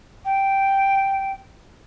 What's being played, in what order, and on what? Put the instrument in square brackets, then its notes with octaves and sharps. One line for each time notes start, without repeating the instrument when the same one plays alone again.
[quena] G5